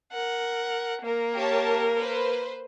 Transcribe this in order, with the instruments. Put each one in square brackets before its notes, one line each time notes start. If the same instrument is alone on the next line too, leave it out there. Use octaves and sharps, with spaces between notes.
[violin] A#4 F#5
A#3 A#4
[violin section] G4 C#5 A5
B4 C5